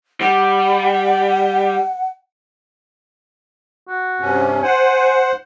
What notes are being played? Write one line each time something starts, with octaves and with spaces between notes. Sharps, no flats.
G3 F#5
F#4
G2 C3 C#4
C5 F#5 G#5